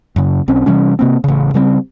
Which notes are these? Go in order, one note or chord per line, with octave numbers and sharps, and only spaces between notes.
F#2 C#3
B1 C4 C#4
C3 E3 G3 C#4
C3 A#3 C4
A1 C#3
C#3 G3 A#3 C4